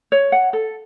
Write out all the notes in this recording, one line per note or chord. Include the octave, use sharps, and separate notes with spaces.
C#5
F#5
A4